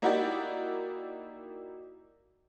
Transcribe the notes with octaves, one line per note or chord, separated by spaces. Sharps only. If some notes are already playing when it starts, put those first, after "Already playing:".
A#3 D#4 E4 F#4 G4 D5